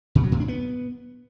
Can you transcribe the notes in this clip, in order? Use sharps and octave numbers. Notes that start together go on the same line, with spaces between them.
A#2
F#3
A2
D4
B3